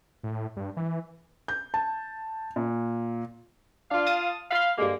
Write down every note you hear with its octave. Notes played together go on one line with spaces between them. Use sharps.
A2
G2
E3
G6
A5
A#2
D4 F4 F5
A5 D#6 A6
F5 B5 C6
G2 D3 G#3 A#3